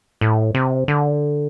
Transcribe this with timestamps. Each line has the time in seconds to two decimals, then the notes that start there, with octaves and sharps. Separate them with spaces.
0.21 A2
0.55 C3
0.88 D3